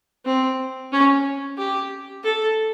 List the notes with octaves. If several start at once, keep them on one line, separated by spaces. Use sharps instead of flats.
C4
C#4
G4
A4